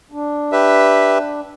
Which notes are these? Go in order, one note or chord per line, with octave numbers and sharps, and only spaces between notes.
D4
G4 B4 E5